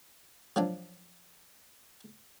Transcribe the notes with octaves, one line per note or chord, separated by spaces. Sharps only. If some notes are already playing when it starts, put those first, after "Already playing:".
F3 F#3 D4